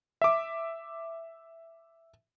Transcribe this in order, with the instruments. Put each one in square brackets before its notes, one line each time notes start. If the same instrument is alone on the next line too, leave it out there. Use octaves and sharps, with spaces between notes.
[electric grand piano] E5 D6